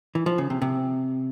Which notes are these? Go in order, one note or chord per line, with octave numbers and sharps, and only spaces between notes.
E3
F3
C#3
C3
C3